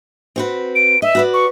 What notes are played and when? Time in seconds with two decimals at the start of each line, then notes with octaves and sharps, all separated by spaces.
0.36 C4 F#4 B4
0.75 D7
1.02 D#5 E5
1.15 F#4 B4 D5
1.34 C#6